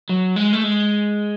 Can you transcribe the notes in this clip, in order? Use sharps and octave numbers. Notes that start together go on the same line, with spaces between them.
F#3
G#3
A3
G#3